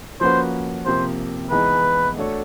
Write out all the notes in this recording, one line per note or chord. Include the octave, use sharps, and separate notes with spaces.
F3 A#3 C#4 F#4 B4 C5
C3 F3 A#3 C5
E3 G#3 B3 D#4 G#4 B4
A3 D4 F#4 A4 C#5